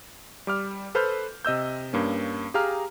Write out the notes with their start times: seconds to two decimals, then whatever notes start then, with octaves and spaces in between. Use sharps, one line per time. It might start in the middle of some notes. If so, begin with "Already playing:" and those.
0.47 G3 D6 F6
0.95 A4 B4 C5 B5 F6 G6
1.45 C3 D#5 E6 G6
1.93 G2 A#3 C#4
2.54 G4 G#4 F5 A#5 F6